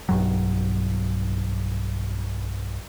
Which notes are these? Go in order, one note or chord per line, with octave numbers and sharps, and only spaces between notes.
B1 G2 F#3